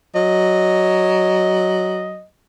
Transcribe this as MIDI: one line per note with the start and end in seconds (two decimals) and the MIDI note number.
0.15 2.24 54
0.15 2.24 75